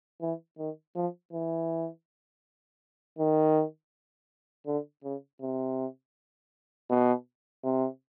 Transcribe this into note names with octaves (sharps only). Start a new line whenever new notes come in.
E3
D#3
F3
E3
D#3
D3
C#3
C3
B2
C3